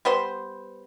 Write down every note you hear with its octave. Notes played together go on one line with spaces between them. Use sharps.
G3 B3 C5 C6